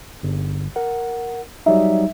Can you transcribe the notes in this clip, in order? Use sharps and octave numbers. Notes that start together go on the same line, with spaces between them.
G1
A#4 F#5
F#3 G3 D#4 E5